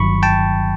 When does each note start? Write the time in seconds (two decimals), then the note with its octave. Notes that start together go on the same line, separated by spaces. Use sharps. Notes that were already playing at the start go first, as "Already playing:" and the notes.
Already playing: G1 G2 D#3 F#3 B5 C#6
0.23 G5 A5